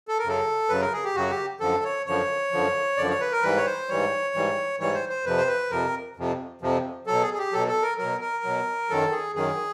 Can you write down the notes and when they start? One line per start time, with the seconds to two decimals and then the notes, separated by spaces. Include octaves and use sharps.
0.08 A4
0.19 A#4
0.24 F#2 C#3 F#3 A4
0.69 F#2 C#3 F#3 B4
0.81 A#4
0.92 G#4
1.04 G4
1.15 F#2 C#3 F#3 F#4
1.30 G4
1.60 F#2 D3 F3 A4
1.84 C#5
2.06 F#2 D3 F3 C#5
2.52 F#2 D3 F3
2.97 F#2 D3 F3 D5
3.09 C#5
3.21 B4
3.32 A#4
3.42 G#2 E3 G3 B4
3.57 C#5
3.66 C5
3.89 G#2 E3 G3 C#5
4.34 G#2 E3 G3
4.79 G#2 E3 G3 C#5
4.94 C5
5.09 C5
5.24 F2 C3 F3 B4
5.37 C5
5.47 B4
5.70 F2 C3 F3 A#4
6.17 F2 C3 F3
6.61 F2 C3 F3
7.07 B2 F#3 A4
7.22 G#4
7.34 G#4
7.38 G4
7.53 B2 F#3 A4
7.68 A4
7.83 A#4
7.98 B2 F#3 A#4
8.21 A#4
8.44 B2 F#3
8.90 F#2 D#3 F#3 A4
9.12 G#4
9.34 F#2 D#3 F#3 G#4